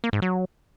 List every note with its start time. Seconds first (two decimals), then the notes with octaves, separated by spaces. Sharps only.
0.04 A#3
0.13 G#2
0.22 F#3